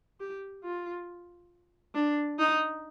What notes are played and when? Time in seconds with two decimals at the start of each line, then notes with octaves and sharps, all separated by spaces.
0.20 G4
0.64 F4
1.95 D4
2.39 D#4